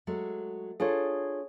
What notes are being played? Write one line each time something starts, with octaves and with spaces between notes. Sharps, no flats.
F#3 G#3 A3
D4 F4 G#4 A4 C#5